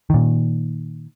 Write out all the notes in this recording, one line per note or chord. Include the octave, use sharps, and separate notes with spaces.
A#2 D#3